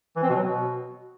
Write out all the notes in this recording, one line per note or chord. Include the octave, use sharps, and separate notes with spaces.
E3
C4
B2
F#3
B2